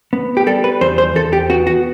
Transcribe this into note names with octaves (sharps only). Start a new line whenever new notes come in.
B3
G4
G3 A4
B4
E2 C5
C5
E2 A4
G4
B3 F#4
F#4